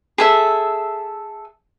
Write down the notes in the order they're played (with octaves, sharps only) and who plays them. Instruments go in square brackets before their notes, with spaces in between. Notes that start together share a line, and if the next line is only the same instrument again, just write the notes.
[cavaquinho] G#4 A4 E5